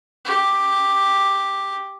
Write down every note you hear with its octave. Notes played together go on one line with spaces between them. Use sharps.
G4